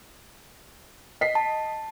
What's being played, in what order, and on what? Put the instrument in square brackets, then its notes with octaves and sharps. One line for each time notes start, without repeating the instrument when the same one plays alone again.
[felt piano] D#5 B6 C7
[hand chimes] A5